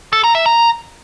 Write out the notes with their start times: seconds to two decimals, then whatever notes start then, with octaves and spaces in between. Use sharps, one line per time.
0.13 A4
0.24 A#5
0.35 E5
0.46 A#5